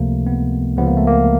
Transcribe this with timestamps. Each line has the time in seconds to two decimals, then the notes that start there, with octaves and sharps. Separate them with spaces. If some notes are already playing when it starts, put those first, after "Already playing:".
Already playing: C#2 C3 F3 A3 A#3
0.27 B3
0.77 C#2 C#3 F3 B3
0.87 A#3
0.97 A3
1.07 A#3